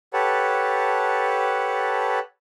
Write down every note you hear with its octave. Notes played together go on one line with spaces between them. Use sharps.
G4 A4 B4 C#5 F#5 A5